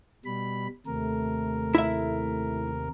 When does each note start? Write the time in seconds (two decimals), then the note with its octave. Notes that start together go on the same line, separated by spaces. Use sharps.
0.25 B2 G3 B5
0.87 D#2 C3 A3 A#4
1.75 E4 E5